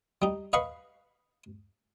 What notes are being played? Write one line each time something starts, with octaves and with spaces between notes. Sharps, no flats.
G3 D#4
B4 D#5 F5 F#5 B5 C#6